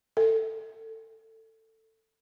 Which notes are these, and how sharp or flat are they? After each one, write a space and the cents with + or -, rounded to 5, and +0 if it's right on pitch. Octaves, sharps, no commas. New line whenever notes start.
A4 +15